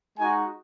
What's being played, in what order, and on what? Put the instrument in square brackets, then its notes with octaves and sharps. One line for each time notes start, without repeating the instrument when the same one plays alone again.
[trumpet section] G#3 D#4 F#4 G#5